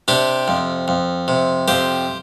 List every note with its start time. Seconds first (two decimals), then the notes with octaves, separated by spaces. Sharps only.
0.08 C3 D4 G4
0.48 F2
0.88 F2
1.28 C3
1.68 F2 G4 C5